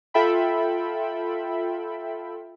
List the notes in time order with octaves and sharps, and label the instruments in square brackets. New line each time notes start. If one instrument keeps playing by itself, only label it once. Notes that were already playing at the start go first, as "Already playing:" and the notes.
[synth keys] F4 A4 E5 G5 B5